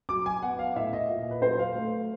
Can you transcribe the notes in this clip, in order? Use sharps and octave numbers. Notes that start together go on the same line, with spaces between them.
F#3 D6
G#5
B3 F#5
F5
A2 E5
D#5
A#2
B4
F#3 C5
F5
A3